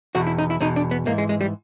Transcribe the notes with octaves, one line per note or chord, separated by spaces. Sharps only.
E2 B2 F#4
E4
D#4
E4
E2 B2 D#4
D4
B3
G#2 E3 A#3
G#3
G#3
G3